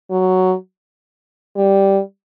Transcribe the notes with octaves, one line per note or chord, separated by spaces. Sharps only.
F#3
G3